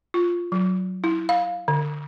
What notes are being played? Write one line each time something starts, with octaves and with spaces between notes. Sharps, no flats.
F4
F#3
E4
F5
D3